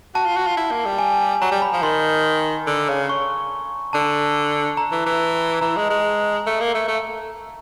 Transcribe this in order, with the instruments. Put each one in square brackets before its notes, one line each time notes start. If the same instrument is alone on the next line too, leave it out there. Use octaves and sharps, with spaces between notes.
[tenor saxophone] F#4 [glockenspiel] A5
[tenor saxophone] F4
F#4
F4
E4
A#3
G3
[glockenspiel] G#5
[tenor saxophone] F#3 [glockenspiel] A#5
[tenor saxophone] G3
[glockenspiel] B5
[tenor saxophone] F3
[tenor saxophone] D#3 [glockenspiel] C6
[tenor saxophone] D3
C#3
[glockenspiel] C#6
[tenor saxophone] D3 [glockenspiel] A5
[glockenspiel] A#5
[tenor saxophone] E3
E3
[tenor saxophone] E3 [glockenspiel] A#5
[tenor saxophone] G#3
G#3
A3
A#3
A3
A3